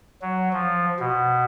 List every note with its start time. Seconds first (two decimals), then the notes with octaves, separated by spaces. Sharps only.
0.22 F#3
0.53 F3
0.99 B2